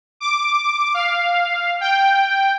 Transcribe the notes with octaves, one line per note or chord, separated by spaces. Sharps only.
D6
F5
G5